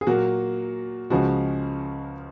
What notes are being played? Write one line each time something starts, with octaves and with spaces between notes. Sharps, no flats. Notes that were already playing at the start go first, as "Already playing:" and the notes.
G#4
A#2 F#3 A#3 F#4
C#2 C#3 F3 G#3 F#4